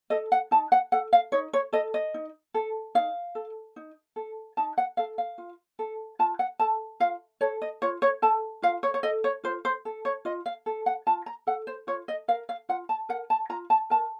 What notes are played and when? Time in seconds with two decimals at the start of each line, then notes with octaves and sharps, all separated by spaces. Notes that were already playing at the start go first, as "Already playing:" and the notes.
0.10 A4 D#5
0.32 F#5
0.51 D#4 A5
0.72 F#5
0.92 A4 F#5
1.13 F5
1.32 D#4 C#5
1.53 C#5
1.73 A4 D#5
1.94 D#5
2.14 D#4
2.54 A4
2.95 D#4 F5
3.35 A4
3.76 D#4
4.16 A4
4.57 D#4 A5
4.78 F#5
4.97 A4 F5
5.18 F5
5.38 F4
5.79 A4
6.19 F4 A5
6.39 F#5
6.59 A4 A5
7.00 F4 F5
7.41 A4 C#5
7.62 D#5
7.82 F4 C#5
8.02 C#5
8.22 A4 A5
8.62 F4 F5
8.83 C#5
8.94 C#5
9.03 A4 D#5
9.24 C#5
9.44 F4 C5
9.65 C5
9.85 A4
10.05 C#5
10.25 F4 D#5
10.46 F5
10.66 A4
10.86 F#5
11.07 F4 A5
11.26 A#5
11.47 A4 F#5
11.67 C5
11.87 F4 C#5
12.08 D#5
12.28 A#4 F5
12.49 F5
12.69 F4 F#5
12.89 A5
13.09 A#4 F#5
13.30 A5
13.49 F4 A#5
13.70 A5
13.90 A#4 A5